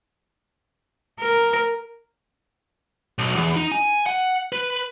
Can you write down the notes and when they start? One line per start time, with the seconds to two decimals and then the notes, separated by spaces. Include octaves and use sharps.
1.20 A#4
3.19 B1
3.36 E2
3.56 D#4
3.71 G#5
4.06 F#5
4.53 B4